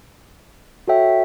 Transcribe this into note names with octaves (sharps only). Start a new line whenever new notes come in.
F#4 A4 C#5 E5 G5